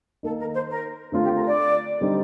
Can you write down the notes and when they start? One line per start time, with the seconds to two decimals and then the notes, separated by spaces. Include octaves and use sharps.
0.23 D#3 A#3 D#4 A4
0.39 A#4
0.54 C5
0.68 A#4
1.12 D3 A3 C4 F4
1.24 G4
1.35 A#4
1.45 D5
2.01 D3 G3 C4 D#4